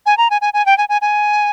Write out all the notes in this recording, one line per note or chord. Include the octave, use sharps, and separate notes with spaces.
G#5
A#5
G#5
G#5
G#5
G5
G#5
G#5
G#5